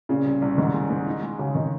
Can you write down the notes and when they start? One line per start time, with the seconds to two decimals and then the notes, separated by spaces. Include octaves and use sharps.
0.09 A#2 C#3
0.26 C2
0.42 C2
0.58 G#2 D#3
0.74 G#3
0.90 G#2
1.07 D#4
1.22 G#3
1.39 C#3
1.55 D#3